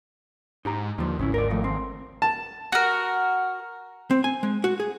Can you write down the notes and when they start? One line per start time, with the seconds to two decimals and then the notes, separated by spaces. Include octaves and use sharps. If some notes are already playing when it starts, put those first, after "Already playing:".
0.65 G#2 D#4 G4 A#5
0.98 D#2 D3 F3
1.19 G#1 C#3 C#4 E4
1.34 A#4 D5
1.50 D#3 F3 A3
1.64 C4
2.22 A5
2.72 F#4 A#4
4.11 C4
4.24 G#5
4.43 G#3
4.64 F#4
4.80 G#4